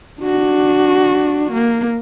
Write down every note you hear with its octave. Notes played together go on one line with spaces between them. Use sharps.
D4 F#4
A#3